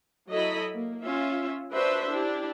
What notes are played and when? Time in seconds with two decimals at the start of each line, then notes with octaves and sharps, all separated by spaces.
0.30 F#3 E4 A4 D#5 B5
0.74 A#3
1.05 C#4 F4 E5
1.71 D4 F#4 B4 C5 E5
2.08 D4 E4 G4